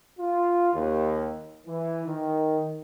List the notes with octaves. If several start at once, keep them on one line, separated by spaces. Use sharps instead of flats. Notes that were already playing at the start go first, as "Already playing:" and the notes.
F4
D#2
E3
D#3